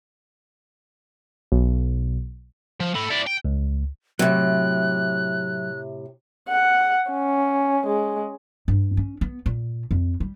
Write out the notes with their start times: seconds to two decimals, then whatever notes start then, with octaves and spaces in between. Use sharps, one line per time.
1.52 B1
2.80 F3
2.95 A4 B5
3.10 E4 D5
3.27 G5
3.45 C#2
4.19 A2 C3 F#3 F#6
6.49 F#5
7.11 C#4
7.87 G#3
8.68 G2
8.97 C#4
9.21 B3
9.46 A#2
9.91 F2
10.20 G3